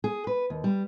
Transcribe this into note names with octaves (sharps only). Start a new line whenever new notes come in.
G#4
B4
D#2
G3